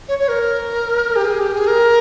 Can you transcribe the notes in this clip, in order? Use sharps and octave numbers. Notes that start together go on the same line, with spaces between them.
C#5
C#5
A#4
G4
G#4
G4
G#4
A#4